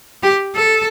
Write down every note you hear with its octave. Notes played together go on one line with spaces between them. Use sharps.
G4
A4